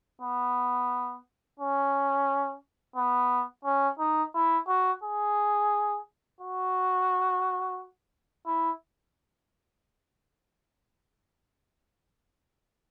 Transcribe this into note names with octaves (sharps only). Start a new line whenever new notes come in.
B3
C#4
B3
C#4
D#4
E4
F#4
G#4
F#4
E4